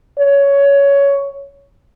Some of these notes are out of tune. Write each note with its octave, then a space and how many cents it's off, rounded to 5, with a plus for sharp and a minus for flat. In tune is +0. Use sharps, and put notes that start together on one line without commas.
C#5 +15